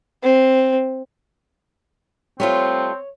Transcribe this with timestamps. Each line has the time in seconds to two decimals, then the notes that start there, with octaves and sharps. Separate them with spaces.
0.23 C4
2.40 G3 A3 C4 F4 C#5